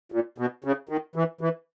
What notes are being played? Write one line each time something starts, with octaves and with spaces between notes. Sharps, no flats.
A#2
B2
C#3
D#3
E3
E3